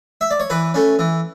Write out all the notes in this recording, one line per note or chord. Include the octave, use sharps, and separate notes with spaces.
E5
D5
C#5
E3 B4
A3 C#4
E3